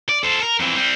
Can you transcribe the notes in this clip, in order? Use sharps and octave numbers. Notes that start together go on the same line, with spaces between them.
D5
A4 C5
A#4
F2 E3
G3 C4